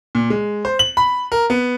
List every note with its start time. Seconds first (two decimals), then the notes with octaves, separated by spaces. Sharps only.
0.15 A#2
0.30 G#3
0.65 C5
0.79 F#7
0.97 B5
1.32 A#4
1.50 B3